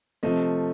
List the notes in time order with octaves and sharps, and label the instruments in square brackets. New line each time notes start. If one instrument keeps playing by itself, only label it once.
[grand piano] C3 F3 A3 D#5